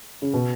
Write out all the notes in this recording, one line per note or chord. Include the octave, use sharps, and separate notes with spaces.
C#3
B2